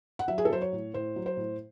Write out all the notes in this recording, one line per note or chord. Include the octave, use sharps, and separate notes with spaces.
F#5
F#3 E5
G#4
A4
F#3 C5
C#5
A2
A2 C5
F#3
C5
A2